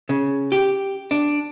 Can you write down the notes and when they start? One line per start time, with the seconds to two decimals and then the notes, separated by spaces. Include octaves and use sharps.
0.09 C#3
0.52 G4
1.11 D4